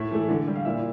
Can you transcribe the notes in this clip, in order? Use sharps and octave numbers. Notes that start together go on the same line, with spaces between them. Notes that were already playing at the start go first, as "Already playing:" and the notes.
Already playing: A2 E4 E5
E3 A3
D3
G3
F5
A#2 E4 E5